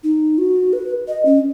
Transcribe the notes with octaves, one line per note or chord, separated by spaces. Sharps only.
D#4
F#4
B4
D#5
C#4